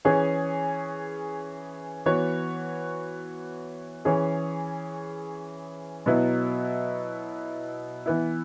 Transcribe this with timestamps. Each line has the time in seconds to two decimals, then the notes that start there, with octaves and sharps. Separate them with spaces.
0.05 E3 C#4 G#4 C#5
2.06 E3 B3 F#4 C#5
4.05 E3 C#4 G#4 C#5
6.06 B2 F#3 B3 E4
8.06 E3 B3 E4